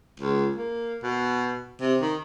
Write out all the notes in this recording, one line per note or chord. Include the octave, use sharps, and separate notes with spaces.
C#2
A#3
B2
C3
D#3